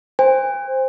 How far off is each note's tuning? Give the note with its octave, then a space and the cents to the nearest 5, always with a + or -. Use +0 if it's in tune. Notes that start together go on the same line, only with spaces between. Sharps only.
C5 +5 G#5 -45